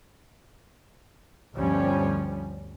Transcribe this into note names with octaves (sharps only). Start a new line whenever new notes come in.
G1 D2 F3 G3 C#4